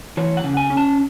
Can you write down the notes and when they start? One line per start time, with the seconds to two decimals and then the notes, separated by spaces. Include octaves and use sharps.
0.17 E3 C#5
0.37 F#5
0.44 C#3
0.57 G#5
0.70 C#4
0.77 A5